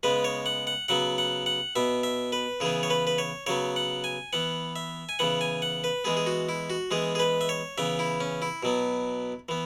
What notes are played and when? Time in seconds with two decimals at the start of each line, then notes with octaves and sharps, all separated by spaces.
0.03 C#3 G#3 B3 B4
0.24 C#5
0.46 F#5
0.67 F#5
0.88 C#3 F#3 B3 F#5
1.18 F#5
1.46 F#5
1.76 B2 B3 E5
2.03 E5
2.32 B4
2.60 C#3 E3 B3 G#4
2.83 C#5
2.90 B4
3.07 B4
3.18 C#5
3.47 C#3 F#3 B3 C#5
3.76 F#5
4.04 G#5
4.33 E3 B3 F#5
4.76 E5
5.09 G#5
5.19 C#3 E3 B3 F#5
5.41 G#5
5.62 F#5
5.84 B4
6.04 E3 G#3 B3 G#4
6.17 G#4
6.26 F#4
6.49 E4
6.70 F#4
6.91 E3 G#3 B3 G#4
7.15 G#4
7.19 B4
7.41 E5
7.49 C#5
7.78 C#3 E3 B3 E5
7.99 E4
8.20 C#4
8.42 E4
8.63 B2 F#3 B3
9.49 E3 B3